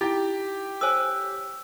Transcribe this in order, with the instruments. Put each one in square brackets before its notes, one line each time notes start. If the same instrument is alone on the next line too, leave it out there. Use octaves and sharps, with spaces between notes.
[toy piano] D#4 E4 [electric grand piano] G4 G5
[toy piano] A4 C5 G#5 [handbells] C#5 E6